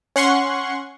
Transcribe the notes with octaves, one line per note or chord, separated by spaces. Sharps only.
C#4 F#5 C6 C#6